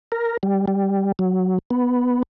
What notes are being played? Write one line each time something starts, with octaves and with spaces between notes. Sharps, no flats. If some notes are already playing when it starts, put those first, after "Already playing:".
A#4
G3
G3
F#3
B3